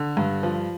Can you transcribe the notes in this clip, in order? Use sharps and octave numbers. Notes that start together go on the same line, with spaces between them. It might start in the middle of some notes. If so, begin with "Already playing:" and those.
Already playing: D3
G2
F3